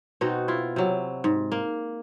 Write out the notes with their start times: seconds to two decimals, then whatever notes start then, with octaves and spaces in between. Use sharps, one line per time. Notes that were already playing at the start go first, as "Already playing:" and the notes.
0.21 B2 C4 D#4 F#4
0.48 E4 F4
0.76 C3 F#3
1.24 G#2
1.52 A#3